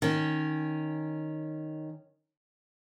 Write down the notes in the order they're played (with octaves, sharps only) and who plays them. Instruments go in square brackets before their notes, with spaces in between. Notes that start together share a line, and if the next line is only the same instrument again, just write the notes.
[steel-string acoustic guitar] D#3 C#4